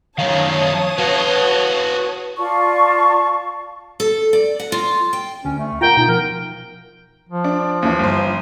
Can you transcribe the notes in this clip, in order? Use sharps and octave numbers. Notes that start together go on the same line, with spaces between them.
F#2 D#3 C#5 F5 A5 D#6
F#4 B4 F5
F4 D5 A5 C#6
A4
D5
F#5
F4
G5
D2 C#4
A3
F4 A#4 F#5 G5 A#5
B2 D#4
F3 A#4
F3
D4
D#2 E3
G1 C5